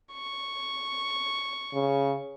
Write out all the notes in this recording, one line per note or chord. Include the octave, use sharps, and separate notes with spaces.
C#6
C#3